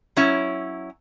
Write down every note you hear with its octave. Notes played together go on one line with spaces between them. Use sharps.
F#3 C#4 E4